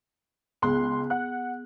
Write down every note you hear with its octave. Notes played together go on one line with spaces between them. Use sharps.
C#2 B3 G#4 C6 F#6
F#5 F#6